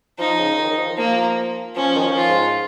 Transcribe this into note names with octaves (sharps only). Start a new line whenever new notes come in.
F3 D#4
C#3
C#3
D#3
D#3
F3
F3 A#3
F3 C#4
D#3
F3
F4
G#2